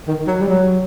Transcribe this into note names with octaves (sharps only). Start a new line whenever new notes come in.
D#3
F#3
G3
F#3